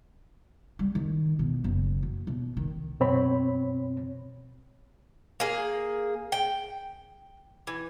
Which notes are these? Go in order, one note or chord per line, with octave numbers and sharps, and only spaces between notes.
G3
D#3
B2
F#1
F#2
B2
D#3
F#2 B2 C4 C#5 B5
A#3 G#4
G5
E3